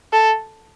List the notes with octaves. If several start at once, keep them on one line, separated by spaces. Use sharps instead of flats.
A4